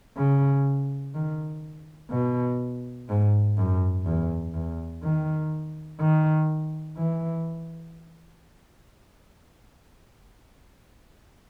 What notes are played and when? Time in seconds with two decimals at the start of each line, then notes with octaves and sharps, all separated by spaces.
0.17 C#3
1.14 D#3
2.11 B2
3.09 G#2
3.57 F#2
4.06 E2
4.54 E2
5.03 D#3
6.00 D#3
6.97 E3